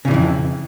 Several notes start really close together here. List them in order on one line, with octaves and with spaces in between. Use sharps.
C#3 A#2 E3 F2